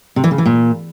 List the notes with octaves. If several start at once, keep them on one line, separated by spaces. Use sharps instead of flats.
C3
E3
C#3
E3
A#2